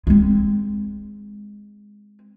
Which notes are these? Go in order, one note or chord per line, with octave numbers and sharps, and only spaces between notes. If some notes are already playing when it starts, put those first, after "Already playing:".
G#3 C4